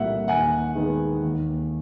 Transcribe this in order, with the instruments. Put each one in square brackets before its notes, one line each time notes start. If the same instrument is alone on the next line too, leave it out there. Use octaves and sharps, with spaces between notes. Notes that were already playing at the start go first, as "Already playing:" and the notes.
Already playing: [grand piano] C2 A#2 G3 A#3 E5 F#5
D#2 F#5 G#5
D#3 G#3 B3
D#2